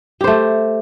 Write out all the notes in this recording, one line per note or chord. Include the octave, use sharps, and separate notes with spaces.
A3 G4 C5